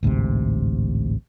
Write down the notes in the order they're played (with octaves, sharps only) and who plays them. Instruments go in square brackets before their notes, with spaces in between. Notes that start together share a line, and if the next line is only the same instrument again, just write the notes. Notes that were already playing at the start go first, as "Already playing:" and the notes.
[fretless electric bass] A1 D2 G#2 C3